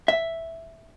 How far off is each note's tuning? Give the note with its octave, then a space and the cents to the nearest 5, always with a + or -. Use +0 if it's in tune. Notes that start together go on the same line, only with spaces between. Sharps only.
E5 +0